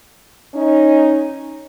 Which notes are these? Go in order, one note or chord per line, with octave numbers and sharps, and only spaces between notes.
C#4 D#4